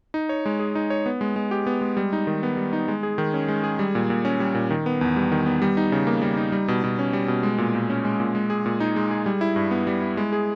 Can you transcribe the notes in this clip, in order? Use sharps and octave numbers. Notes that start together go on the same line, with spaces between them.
D#4
C#5
G#3
G#4
D#4
C#5
B3
G#3
G#3
G4
B3
G#3
G3
D#4
D#3
B3
G3
D#4
G#3
G#4
D#3
C#4
G#3
G#4
G3
A#2
A#2
C#4
G3
A#2
D#3
B3
E2
G3
D#3
B3
G3
D#4
C#3
A#3
G3
D#4
G3
B2
B2
C#4
G3
B2
G#3
A#2
A#2
C#4
G#3
A#2
G#3
G#4
A#2
D#4
G#3
G#4
G3
E4
G2
B3
G3
E4
G#3
G#4